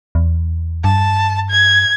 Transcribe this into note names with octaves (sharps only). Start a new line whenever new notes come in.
E2
G2 A5
G#6